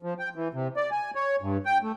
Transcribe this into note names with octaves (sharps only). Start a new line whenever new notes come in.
F3
G5
E3
C3
D5
G#5
C#5
G2
G5
A3